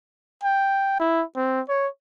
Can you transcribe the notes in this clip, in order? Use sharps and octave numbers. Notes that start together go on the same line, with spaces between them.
G5
E4
C4
C#5